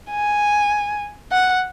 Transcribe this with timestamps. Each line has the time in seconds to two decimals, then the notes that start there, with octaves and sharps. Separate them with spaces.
0.11 G#5
1.32 F#5